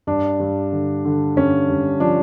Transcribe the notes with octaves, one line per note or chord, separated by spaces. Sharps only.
G2 D4
G2
D3
D3
G2 C#4
G2
F3 D4